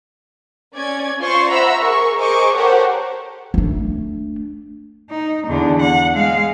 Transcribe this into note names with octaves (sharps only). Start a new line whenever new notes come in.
C#4 D5 G#6
F4 C5 D5 C6 C#6
C5 E5 F#5 A#5 B5 E6
G#4 A#4 C#6
G#4 A#4 C5 D#5 C#6 D6
G4 A4 A#4 C5 C#5 F#5
A3 D4
D#4
E2 D3
F#5
G#3 F5